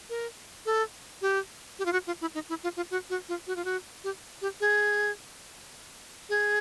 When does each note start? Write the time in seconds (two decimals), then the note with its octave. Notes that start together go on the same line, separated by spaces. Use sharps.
0.10 A#4
0.66 A4
1.22 G4
1.79 G4
1.85 F4
1.93 F#4
2.07 F4
2.21 E4
2.35 D#4
2.49 E4
2.63 F4
2.77 F4
2.91 F#4
3.10 F#4
3.29 F4
3.47 F#4
3.56 F4
3.65 F#4
4.04 G4
4.42 G4
4.60 G#4
6.29 G#4